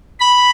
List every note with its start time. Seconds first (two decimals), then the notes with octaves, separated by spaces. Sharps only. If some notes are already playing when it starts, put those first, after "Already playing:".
0.20 B5